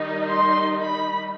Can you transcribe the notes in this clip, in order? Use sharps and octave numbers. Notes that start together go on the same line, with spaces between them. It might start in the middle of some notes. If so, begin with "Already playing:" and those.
Already playing: D#3 G3 D#4
C6
B5